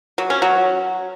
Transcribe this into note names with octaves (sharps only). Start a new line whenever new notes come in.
F#3
C#4
F#3